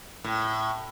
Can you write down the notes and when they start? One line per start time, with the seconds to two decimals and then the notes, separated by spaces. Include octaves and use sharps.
0.24 A2